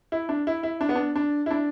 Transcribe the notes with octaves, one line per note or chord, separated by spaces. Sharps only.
E4
D4
E4
E4
D4
B3
D4
D4
E4
D4